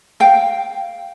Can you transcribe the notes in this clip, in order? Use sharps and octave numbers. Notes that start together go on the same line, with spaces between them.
F5 G5